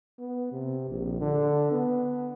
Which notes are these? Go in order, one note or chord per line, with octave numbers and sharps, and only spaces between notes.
B3
C3
A#1
D3
B3